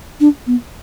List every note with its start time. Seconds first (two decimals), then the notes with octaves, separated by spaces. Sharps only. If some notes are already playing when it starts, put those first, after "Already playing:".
0.20 D4
0.47 B3